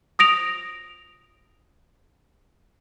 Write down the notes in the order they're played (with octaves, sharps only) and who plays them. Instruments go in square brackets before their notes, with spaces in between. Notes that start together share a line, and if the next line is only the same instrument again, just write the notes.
[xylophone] D#6 A#6 D7 F7